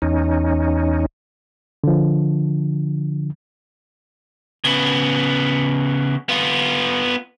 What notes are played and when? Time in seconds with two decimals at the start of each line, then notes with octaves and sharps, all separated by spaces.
0.02 E2 C#4 D#4
1.84 D3 F3
4.64 C#3 B3
6.29 B3 F4